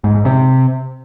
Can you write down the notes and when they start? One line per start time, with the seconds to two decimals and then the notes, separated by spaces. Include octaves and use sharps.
0.04 G#2
0.15 G#2
0.25 C3